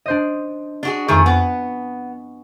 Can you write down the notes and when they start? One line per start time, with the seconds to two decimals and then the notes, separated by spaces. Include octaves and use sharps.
0.06 D4 C5 D#5
0.83 D4 F#4 G#4
1.08 F2 D#3 A3 G#4 G#5 C#6
1.26 B3 F#4